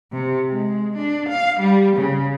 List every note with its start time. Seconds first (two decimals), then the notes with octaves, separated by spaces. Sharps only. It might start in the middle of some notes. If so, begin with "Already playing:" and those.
0.13 C3
0.50 G#3
0.97 D4
1.29 F5
1.60 G3
1.97 C#3